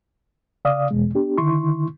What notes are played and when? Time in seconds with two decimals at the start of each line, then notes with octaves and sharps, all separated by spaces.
0.65 C#3 D5 F5 D#6
0.91 E2 B2 G#3
1.15 B3 D4 G4
1.38 D3 D#3 E4 C6 C#6